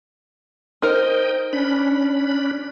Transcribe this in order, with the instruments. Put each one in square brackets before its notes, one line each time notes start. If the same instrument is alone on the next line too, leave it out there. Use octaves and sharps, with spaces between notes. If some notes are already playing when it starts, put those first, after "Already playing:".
[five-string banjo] D#4 A#4 C5 [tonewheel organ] D#5 G5
[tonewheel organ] C#4 D4 B5